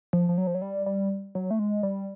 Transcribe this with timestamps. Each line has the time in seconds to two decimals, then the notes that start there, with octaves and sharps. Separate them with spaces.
0.13 F3
0.29 F3
0.38 F#3
0.47 F3
0.55 F#3
0.62 G3
0.86 G3
1.35 F#3
1.51 A3
1.59 G#3
1.83 G3